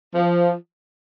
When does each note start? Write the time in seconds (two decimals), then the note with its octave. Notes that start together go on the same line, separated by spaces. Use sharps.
0.15 F3